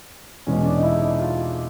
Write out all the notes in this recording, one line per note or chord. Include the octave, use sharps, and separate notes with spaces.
E2 B2 G#3 C#4
D4
D#4
E4
D#4
F4